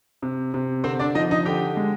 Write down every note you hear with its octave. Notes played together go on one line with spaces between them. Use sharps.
C3
C3
D3 C4 C5
D4 D5
F3 D#4 D#5
D#4 D#5
D3 G4 G5
G#3